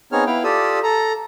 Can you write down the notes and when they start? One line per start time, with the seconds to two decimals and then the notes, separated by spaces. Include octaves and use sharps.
0.12 B3 C4 D#4 G#4 C#5 F6
0.27 B3 E4 F5 G5
0.44 F4 G4 A4 D5 D#6 E6
0.83 A4 A#5